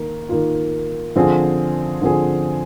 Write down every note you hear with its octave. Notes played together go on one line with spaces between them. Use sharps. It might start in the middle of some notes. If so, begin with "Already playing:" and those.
Already playing: D#3 A#3
D#3 A#3 F4
D3 F3 C4 F4 G#4
D3 F3 C4 F4 G#4